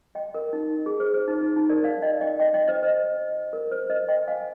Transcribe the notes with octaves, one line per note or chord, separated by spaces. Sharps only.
D#5 G5
A#4
D#4
G#4
C5
C5
D#4
D#4
D#4
A#4 D5
D5 F5
D#5 G5
D#5 G5
D#5 G5
D#5 G5
C5 D#5
C5
A#4
C5
C5 D#5
D#5 G5
F5 G#5